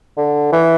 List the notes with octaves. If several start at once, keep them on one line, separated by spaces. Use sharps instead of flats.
D3
E3